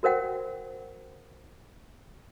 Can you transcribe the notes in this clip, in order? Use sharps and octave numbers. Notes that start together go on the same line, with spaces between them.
F#4 A#4 C5 F#5 G5